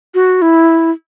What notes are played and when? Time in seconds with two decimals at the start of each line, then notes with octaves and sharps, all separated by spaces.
0.14 F#4
0.42 E4